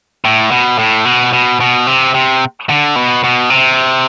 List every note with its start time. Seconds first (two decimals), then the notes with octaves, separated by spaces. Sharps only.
0.25 A2
0.51 B2
0.79 A2
1.05 B2
1.33 B2
1.60 B2
1.87 C3
2.14 C3
2.69 D3
2.96 B2
3.24 B2
3.50 C3